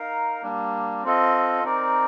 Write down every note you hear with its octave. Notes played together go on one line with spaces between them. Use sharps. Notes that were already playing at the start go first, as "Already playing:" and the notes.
Already playing: D#4 A#4 F5
G3 A#3 D4
C4 F4 A4 D#5
C4 D#4 A#4 D5